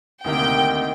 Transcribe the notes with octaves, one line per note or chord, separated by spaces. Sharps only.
D2 C3 D#3 A#3 D#4 G5